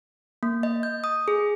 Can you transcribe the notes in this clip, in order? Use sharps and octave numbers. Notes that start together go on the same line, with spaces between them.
A#3
D#5
G6
D#6
G#4